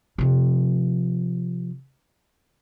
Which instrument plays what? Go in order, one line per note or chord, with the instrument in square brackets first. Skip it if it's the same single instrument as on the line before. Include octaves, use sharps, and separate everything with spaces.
[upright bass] C3 F3